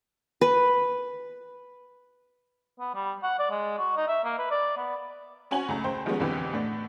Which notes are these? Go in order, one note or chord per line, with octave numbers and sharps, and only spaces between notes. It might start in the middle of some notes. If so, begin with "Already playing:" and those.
B4
B3
G3
F#5
D5
G#3
F#4
D#4
E5
A#3
B4
D5
B3
C4 C#4 F#4 G#5 F#7
C#2 A3 A#5
C#2 C5 G5
D#3 F3 G3 G#3 B3 C#4
B1 F2 D3 E3 G4 B4
A2 A3 B3 D4